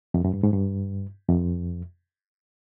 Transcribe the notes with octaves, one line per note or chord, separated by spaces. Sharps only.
F2
F#2
G2
G#2
G2
F2